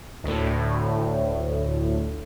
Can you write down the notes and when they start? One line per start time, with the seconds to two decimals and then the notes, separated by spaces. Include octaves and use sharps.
0.24 D2 A2